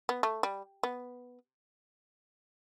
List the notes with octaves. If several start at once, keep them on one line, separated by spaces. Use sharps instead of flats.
B3
A3
G3
B3